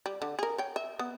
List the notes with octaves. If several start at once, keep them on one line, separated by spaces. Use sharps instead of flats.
G3
D3
G#4 A#4
C#5 G5
E5
B3